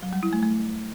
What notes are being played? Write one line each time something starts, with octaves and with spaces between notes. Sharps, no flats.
F#3
G3
E4
A3
A3